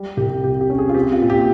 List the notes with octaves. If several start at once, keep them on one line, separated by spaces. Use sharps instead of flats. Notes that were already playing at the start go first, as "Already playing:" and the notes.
Already playing: G3
C2 G4
C3 G4
G4
C#4
G#4
F4
C4 G4
F4
A#2
G4